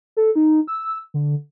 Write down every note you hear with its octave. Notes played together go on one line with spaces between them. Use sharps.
A4
D#4
E6
D3